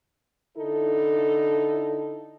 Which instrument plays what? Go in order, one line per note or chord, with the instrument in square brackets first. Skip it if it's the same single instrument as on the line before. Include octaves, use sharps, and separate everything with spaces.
[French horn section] D3 D#4 E4 A4